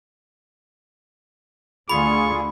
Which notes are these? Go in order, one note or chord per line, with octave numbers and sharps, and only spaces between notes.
D2 D3 F4 G#4 B5 C#6